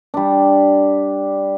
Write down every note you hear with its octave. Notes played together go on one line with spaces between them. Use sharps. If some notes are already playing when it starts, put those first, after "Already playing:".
G3 D4